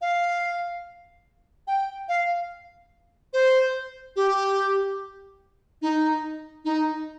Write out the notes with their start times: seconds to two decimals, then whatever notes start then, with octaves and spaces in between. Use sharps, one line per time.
0.01 F5
1.67 G5
2.09 F5
3.33 C5
4.16 G4
5.82 D#4
6.65 D#4